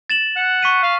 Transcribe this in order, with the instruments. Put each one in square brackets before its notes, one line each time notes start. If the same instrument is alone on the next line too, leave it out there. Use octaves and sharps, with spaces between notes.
[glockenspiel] A6 E7 F#7
[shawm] F#5
[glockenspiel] C#6 B6 D#7
[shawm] F5